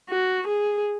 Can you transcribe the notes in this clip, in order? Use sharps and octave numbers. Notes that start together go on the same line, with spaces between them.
F#4
G#4